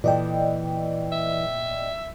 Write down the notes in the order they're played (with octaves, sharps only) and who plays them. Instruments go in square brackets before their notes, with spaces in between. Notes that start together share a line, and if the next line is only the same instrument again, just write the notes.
[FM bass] A#2 [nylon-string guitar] E3 A4 [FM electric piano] D5 D#5 G5
[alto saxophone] E5